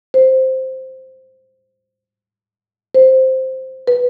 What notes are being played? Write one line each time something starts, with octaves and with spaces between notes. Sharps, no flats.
C5
C5
B4